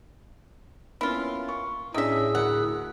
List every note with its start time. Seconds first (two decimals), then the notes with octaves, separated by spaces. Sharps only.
1.01 A#3 B3 C#4 E4 F4
1.49 C#6
1.94 A2 C3 C#4 D4 G#4 D#5 E5 E6
2.35 D2 A#4 F#5